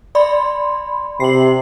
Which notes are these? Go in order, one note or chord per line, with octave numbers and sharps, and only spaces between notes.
D5 B5 C6
C3 C7 F#7